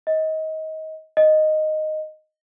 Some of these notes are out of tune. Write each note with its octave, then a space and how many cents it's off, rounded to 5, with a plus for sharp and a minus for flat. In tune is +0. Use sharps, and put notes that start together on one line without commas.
D#5 +25
D#5 -5